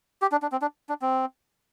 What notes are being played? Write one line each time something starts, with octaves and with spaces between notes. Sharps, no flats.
G4
D4
D4
C4
D4
D4
C4